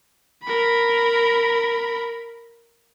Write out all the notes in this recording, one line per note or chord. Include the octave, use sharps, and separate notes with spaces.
A#4 B5